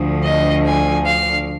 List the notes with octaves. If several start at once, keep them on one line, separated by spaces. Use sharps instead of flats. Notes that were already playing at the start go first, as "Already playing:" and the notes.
Already playing: D2 D3 F3
D#5
G#5
F5